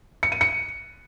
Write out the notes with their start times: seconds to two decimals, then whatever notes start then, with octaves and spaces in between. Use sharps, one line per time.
0.23 C#7
0.32 D#7
0.41 C#7